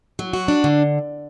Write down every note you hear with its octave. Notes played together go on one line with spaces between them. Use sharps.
F#3
F#4
D4
D3